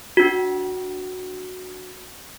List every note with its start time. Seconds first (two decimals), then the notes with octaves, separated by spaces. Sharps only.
0.17 D4 F#4